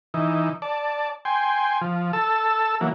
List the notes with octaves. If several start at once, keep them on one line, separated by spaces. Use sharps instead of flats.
E3 D#4
D5 A5
G5 G#5 C6
F3
A4 A5 E6
E3 F#3 A#3